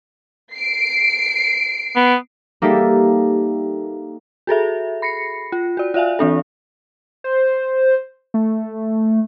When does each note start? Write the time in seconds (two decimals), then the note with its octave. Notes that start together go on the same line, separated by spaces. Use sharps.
0.56 C7 D7
1.96 B3
2.62 G3 A#3 D#4 G4 A4 E5
4.47 F#4 G#4 A4 E5
5.02 B5 A#6 C7 C#7
5.52 F4
5.77 F#4 D5
5.94 F4 D5 E5 F5 G#5
6.19 E3 C4 D4 A4
7.24 C5
8.34 A3